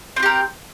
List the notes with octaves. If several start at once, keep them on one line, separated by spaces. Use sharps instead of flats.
C4 F4 G4 A#4